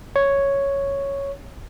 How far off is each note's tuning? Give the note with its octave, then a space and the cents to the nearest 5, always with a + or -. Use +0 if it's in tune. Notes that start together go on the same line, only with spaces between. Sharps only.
C#5 +0